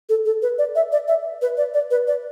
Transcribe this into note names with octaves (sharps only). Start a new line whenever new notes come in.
A4
A4
B4
D5
E5
D5
E5
B4
D5
D5
B4
D5